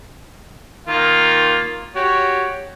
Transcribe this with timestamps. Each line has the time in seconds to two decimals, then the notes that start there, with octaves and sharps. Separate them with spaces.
0.87 D#3 A#3 F4
1.96 F#4 G4 C#5